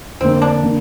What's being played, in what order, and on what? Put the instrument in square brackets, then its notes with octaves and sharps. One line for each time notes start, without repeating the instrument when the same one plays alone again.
[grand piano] F2 D3 A#3 [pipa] C4
[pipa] D4
[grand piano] D3 A#3